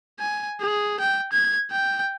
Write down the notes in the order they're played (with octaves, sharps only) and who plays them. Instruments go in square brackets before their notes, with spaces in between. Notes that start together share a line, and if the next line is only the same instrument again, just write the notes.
[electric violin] G#5
G#4
G5
G#6
G5